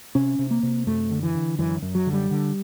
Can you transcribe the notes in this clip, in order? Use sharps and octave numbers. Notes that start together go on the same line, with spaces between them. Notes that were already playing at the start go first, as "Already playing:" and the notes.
C3 C#4
C3
A#3
C3
F#2 A3
D3
E3
D3
F#2 E3
F#2
F#3
D3
G3
D3